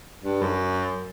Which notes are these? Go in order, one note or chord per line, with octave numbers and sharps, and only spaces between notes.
G2
F#2